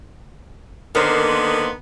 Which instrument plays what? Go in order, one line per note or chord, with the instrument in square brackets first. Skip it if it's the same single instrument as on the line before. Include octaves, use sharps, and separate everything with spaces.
[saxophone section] D3 D#3 B3 [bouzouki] A#3 C5